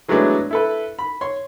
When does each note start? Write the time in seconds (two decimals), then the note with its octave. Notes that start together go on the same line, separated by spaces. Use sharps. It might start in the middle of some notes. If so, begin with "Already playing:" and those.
0.08 E3 F#3 G#3 A3 B3 D4
0.51 E4 A4 B4
0.99 B5
1.21 C#5 C6